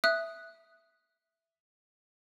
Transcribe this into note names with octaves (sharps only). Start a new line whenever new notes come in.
E5 D#6 F#6